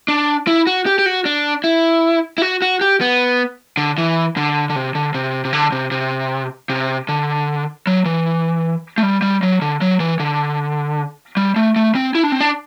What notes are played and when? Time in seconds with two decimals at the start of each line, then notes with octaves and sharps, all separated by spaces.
0.08 D4
0.47 E4
0.67 F#4
0.86 G4
0.99 G4
1.06 F#4
1.25 D4
1.64 E4
2.38 E4
2.42 F#4
2.62 F#4
2.81 G4
3.01 B3
3.77 D3
3.98 E3
4.37 D3
4.70 D3
4.76 C3
4.95 D3
5.14 C3
5.45 C3
5.53 D3
5.72 C3
5.91 C3
6.69 C3
7.09 D3
7.87 F#3
8.05 E3
8.98 A3
9.03 G3
9.22 G3
9.43 F#3
9.62 D3
9.81 F#3
10.00 E3
10.20 D3
11.37 G3
11.56 A3
11.76 A3
11.95 C4
12.15 E4
12.23 D4
12.32 C4
12.41 D4